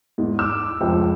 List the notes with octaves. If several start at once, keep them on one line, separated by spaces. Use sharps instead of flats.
E2 G#2
D6 E6
F1 C#2 F3 G5